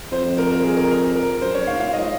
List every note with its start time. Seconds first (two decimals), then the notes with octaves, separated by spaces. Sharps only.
0.12 F2 C5
0.38 A#4
0.51 A#4
0.64 G#4
0.77 A#4
0.90 A#4
1.16 A#4
1.41 F#2 C5
1.54 F#2 C#5
1.67 G#2 F5
1.80 A#2 F5
1.93 G#2 D#5